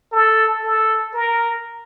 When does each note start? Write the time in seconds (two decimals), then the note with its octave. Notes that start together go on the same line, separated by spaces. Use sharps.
0.12 A4
0.64 A4
1.14 A#4